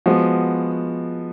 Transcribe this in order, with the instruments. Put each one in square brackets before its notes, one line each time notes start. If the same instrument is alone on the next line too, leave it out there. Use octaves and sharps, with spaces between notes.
[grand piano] F3 G#3 B3 F#4